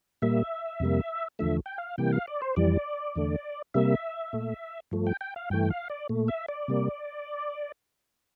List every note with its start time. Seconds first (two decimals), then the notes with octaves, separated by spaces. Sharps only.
0.22 A#2 G3 A#3 E5
0.80 F2 C3 G3 A#3
1.39 E2 D3 F3 A3 E5
1.66 G5
1.78 F5
1.98 C3 E3 G3 A#3 G5
2.12 F5
2.28 D5
2.42 C5
2.56 F2 E3 G3 D5
3.15 E2 D3 A3
3.74 C3 G3 A#3 E5
4.33 A#2 A3
4.91 G2 F3 A3
5.07 G5
5.21 G5
5.36 F5
5.50 G2 E3 A3 G5
5.70 F5
5.90 D5
6.09 A#2 A3
6.28 E5
6.48 D5
6.68 C3 G3 A#3